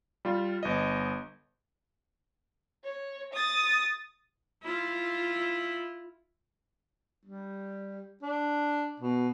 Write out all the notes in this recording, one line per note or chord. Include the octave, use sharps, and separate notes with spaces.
G3 F4
G1 D#5
C#5
D#6 A6
E4 F4
G3
D4
B2